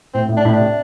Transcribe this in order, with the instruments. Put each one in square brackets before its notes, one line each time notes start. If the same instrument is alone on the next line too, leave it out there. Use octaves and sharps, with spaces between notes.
[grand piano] A2 [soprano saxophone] C4
[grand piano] A2
[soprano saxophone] D4
[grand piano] A2 [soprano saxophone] E4
[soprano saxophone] D4
[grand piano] C3